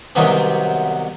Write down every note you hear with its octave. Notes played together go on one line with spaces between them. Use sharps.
C2 C3 D#3 F#3 B3 C4